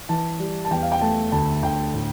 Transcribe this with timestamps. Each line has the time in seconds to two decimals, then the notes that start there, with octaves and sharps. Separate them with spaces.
0.09 E3 A5
0.40 G3
0.65 A5
0.71 E2 G5
0.82 F5
0.92 G5
1.01 A3 A5
1.32 D2 A5
1.63 D2 G5
1.94 A2